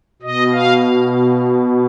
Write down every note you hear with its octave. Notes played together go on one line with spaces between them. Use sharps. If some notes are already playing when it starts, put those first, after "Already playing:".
B2 D#5
F5